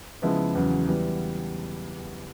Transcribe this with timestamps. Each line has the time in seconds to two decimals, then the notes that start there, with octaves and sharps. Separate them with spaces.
0.22 C#3 F3 G#3 B3 E4
0.55 E2 C#3 F#3
0.87 E3 G3 B3